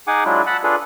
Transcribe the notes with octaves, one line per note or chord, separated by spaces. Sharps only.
D#4 G#4 F#5 G#5 D6
F#3 G#3 D4 E4 F4
F#5 A5 B5 E6 F#6
D4 F4 G#4 A4 B4